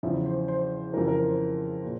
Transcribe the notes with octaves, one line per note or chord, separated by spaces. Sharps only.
E2 C#3 F3 E5
C5
C5
F2 C#3 E3 A#4
A#4
C5
A#2